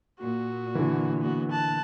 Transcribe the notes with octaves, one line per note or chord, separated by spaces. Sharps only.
A#2 F#4
D3 E3
B3 F#4
A5 F#6